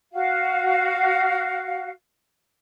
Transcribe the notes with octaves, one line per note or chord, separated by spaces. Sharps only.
F#4 F5